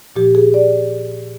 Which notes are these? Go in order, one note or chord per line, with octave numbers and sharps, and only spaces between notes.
A#2 F3 G4
G#4
D5